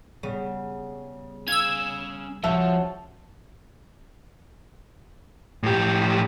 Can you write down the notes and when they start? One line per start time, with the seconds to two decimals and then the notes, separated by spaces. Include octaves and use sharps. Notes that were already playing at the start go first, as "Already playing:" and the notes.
0.23 C#3 G3 B3 D#7
1.48 C#4 F5 E6 G#6
2.44 C#2 F3 F#4 E5 A5
5.63 A2 G4